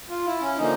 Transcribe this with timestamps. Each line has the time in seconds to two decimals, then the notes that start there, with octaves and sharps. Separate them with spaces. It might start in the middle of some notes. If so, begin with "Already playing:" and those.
0.10 F4
0.26 E4
0.41 C#4
0.58 D3 F3 A#3 D#4